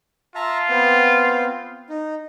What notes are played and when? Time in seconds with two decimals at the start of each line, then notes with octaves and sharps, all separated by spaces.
0.35 F4 E5 A5 A#5
0.69 B3 C4
1.89 D#4